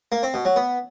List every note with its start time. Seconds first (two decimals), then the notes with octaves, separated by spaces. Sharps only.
0.12 A#3
0.23 C4
0.34 B2
0.45 F#3
0.56 B3